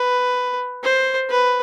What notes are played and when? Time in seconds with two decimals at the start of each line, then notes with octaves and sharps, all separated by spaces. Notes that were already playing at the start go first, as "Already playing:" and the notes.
Already playing: B4
0.83 C5
1.30 B4